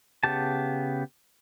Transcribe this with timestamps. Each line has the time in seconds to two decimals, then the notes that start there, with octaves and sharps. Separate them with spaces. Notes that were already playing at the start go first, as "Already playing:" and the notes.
0.23 C#3 B3 G4 A5